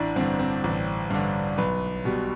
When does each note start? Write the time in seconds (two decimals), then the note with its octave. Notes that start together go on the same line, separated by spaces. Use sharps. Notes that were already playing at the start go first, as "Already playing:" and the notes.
Already playing: A1 D4 E4
0.16 G2 D3 C4
0.39 C4
0.64 A1
1.10 G2 D3
1.58 B1 B4
2.05 B2 G3